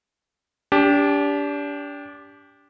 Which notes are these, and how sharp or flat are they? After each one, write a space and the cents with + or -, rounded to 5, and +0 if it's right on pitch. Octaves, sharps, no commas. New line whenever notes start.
D4 -30 G4 +10